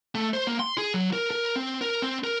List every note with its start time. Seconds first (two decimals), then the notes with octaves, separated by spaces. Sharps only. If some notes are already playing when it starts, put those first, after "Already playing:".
0.15 A3
0.34 C5
0.47 A#3
0.60 C6
0.78 G#4
0.94 F#3
1.13 A#4
1.31 A#4
1.56 C4
1.81 A#4
2.02 C4
2.24 A#4